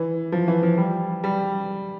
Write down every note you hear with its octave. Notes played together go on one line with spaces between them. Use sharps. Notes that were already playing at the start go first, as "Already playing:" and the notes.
Already playing: E3
F3
E3
F3
G3
G3